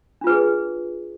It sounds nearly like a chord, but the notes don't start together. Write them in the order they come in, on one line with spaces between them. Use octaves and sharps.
D4 F4 B4 G#4